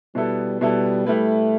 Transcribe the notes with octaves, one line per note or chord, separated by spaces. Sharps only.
B2 G3 B3 E4 A4
B2 G3 B3 E4 A4
G3 A3 E4 B4